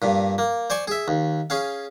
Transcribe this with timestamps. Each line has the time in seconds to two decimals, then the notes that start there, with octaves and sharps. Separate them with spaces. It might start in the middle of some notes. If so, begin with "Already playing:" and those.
0.02 G2 A#2
0.38 A#3
0.70 C5 D5 G#5 C#6
0.88 G#4 E5
1.08 D#2
1.50 C#4 G#4 F5